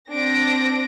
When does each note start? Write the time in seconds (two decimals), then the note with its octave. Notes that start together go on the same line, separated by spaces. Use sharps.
0.11 C4 D4 A#6 D7